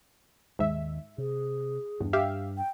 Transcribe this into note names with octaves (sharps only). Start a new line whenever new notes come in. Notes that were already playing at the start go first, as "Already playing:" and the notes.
D#2 G#2 D#3 E5
C3 G#4
E2 G2 D4
G4 E5 F5
G5